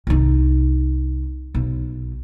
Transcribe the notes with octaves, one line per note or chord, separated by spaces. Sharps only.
C2 D#4
B1